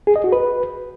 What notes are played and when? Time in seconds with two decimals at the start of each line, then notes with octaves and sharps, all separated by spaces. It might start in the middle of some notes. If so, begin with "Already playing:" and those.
0.07 G#4
0.16 D#5
0.24 F#4
0.32 B4